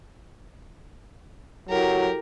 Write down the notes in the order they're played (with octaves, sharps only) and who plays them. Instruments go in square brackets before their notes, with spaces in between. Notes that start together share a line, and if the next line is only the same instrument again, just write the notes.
[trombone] F#3 [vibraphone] E4 F#4 A4 [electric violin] G4 A#4